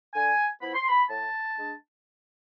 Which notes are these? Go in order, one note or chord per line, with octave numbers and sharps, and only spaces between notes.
D3 G#5
F3 B3 E4 B5
C6
B5
A2 A5
G#3 D4